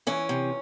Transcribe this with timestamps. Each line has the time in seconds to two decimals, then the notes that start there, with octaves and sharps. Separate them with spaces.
0.07 E3 C#4
0.29 C3